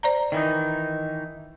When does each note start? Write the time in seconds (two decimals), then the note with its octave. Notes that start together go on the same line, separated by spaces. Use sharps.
0.03 C5 D5 A#5
0.32 D#3 E3 D#4